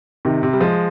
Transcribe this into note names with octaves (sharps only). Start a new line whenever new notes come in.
C3 D#3
C3
G3
F3 G#3